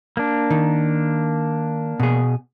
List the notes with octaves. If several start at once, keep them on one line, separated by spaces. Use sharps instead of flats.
A#3 D4
D#3
B2 G#4